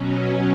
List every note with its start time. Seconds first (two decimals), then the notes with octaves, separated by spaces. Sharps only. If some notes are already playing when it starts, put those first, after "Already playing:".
Already playing: B2 F#3 C#4